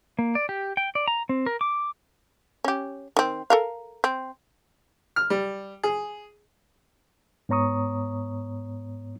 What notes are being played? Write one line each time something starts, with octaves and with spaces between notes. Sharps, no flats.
A#3
D5
G4
G5
D5
A#5
C4
A#4
D6
C#4 G4
D#3 C4
A4 A#4 F5
C4
F6
G3
G#4
G#2 B3 C#5 A#5 C#6 D#6